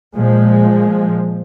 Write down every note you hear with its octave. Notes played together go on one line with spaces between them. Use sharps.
A#2 F3 G#3